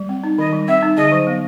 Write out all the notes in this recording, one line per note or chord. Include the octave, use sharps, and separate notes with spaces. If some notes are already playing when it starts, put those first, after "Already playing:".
Already playing: G3
C4
D#4
D#3 D#5
G3
C4 E5
D#4
D3 D#5
F#3
B3